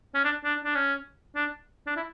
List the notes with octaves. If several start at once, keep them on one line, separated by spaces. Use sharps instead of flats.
C#4
D4
D4
D4
C#4
D4
D4
E4